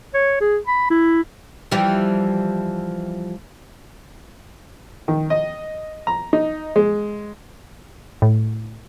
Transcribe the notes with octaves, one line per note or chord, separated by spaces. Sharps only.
C#5
G#4
B5
E4
E3 F3 G3
D#3
D#5
A#5
D#4
G#3
A2